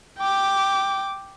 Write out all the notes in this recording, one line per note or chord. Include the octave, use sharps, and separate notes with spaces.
G5 D6